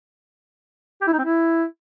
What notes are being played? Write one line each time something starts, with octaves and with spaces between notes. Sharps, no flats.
G4
E4
D#4
C4
E4